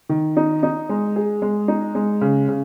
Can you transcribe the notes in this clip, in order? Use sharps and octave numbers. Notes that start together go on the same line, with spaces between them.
D#3
D#4
D#4
G#3
G#4
G#3
D#4
G#3
C#3
C#3